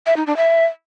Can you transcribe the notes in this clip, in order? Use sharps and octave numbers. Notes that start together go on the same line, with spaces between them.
E5
D#4
D4
E5